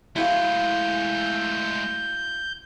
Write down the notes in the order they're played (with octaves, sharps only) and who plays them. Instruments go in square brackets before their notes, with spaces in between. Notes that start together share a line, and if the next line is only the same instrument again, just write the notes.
[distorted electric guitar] G#3 A3 [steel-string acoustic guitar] E4 F#4 F5 [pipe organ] G6